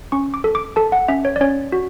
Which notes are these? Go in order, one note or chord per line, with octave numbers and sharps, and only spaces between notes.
C#4 C#6
D6
A4
D6
A4 A5
F#5
C#4 E5
C#5
D5
C#4 C#5
F#4